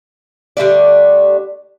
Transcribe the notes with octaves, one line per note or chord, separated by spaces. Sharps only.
D3 G3 A3 D5